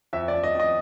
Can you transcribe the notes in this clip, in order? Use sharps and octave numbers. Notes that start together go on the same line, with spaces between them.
F2 E5
D5
F2
D#5
F2 D#5